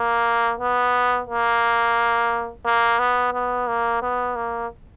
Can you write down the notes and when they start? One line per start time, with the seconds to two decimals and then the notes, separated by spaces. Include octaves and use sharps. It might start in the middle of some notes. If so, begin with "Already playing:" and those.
Already playing: A#3
0.59 B3
1.27 A#3
2.65 A#3
2.99 B3
3.33 B3
3.67 A#3
4.02 B3
4.36 A#3